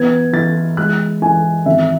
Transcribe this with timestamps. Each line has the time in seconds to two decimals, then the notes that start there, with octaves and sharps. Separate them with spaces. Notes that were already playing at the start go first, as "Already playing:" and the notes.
Already playing: E3 B3 G#6
0.33 E3 A6
0.77 G#3 F#6
1.22 E3 G#5
1.66 G#1 E5